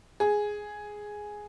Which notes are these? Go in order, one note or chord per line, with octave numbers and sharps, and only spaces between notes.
G#4